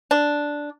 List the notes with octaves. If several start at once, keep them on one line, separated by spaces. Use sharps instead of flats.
D4